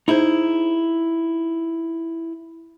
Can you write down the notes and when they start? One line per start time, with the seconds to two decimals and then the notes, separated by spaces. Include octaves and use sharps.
0.08 D#4 E4 G#4 C5